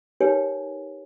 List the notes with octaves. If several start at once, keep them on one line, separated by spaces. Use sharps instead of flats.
D#4 G4 A#4 B4 C#5 G#5